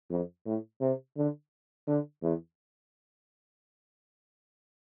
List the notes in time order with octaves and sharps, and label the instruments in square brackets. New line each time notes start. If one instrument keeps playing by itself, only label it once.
[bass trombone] F2
A2
C3
D3
D3
E2